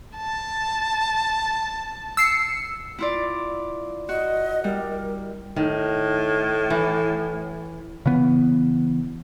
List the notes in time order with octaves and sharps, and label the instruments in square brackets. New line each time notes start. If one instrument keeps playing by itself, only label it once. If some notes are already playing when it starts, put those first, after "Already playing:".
[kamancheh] A5
[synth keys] E6 C7 C#7
[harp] E4 F4 D5
[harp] F#4 [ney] D#5
[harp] G3 [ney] A#4
[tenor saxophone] A2 [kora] D#3
[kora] E3
[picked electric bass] C#3 E3 B3